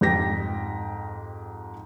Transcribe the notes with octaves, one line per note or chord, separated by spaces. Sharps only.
F2 G#2 G4 G5 A#6 B6